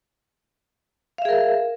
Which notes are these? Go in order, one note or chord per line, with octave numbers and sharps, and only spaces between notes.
G#4 A#4 E5 F5